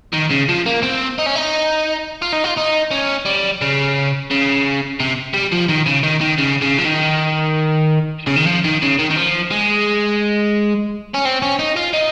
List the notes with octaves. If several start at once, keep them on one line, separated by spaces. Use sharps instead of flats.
D#3
C#3
F3
A#3
C4
D#4
C#4
D#4
F4
D#4
F4
D#4
C#4
G3
C#3
C#3
C3
G3
F3
D#3
C#3
D#3
D#3
C#3
C#3
F3
D#3
C#3
D#3
F3
D#3
C#3
D#3
D#3
F3
G#3
C#4
C4
C#4
D#4
F4
D#4